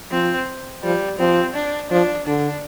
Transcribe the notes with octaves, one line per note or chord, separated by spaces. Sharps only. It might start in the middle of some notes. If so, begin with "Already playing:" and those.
F3 C4
F3 G3
F3 C4
D4
F3 D4
D3 D4